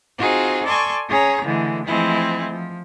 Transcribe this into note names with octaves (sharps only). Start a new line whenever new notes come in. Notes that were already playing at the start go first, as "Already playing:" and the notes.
C4 D#4 F4 F#4 G#4
A4 D5 G#5 C6 C#6
C#4 G#4 C#5 A#5
D3 E3 G#3 A3
E3 F3 G#3 A3 C4 E4
F3